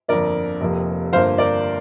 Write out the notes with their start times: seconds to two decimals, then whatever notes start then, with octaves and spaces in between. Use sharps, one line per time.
0.08 G1 F2 D3 F3 A#3 A#4 D5
0.61 F1 F2 C3 A#3
1.13 G1 G2 F3 A#3 C5 F5
1.38 A#4 D5